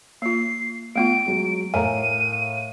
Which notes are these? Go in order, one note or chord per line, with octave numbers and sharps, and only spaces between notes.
A#3 F4 C7
A3 B3 F4 D7
F#3 G#3
A2 A#4 F5 G#5 A#5 D#7